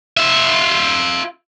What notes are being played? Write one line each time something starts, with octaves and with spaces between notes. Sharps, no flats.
F4 E5